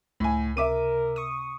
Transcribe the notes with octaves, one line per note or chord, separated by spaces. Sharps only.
C#2 A2 G#5
C3 A#4 E5 D6 D#7
C#6 D#6